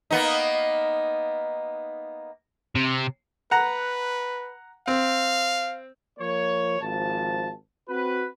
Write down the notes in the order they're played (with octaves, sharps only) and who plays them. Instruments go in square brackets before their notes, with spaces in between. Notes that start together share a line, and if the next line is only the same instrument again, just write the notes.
[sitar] A#3 B3 D#4
[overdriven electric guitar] C3
[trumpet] B4 [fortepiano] F#5 A#5
[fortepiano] C4 [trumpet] F5
[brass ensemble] F3 A#3 C#5
G#1 F3 A5
C4 F#4 B4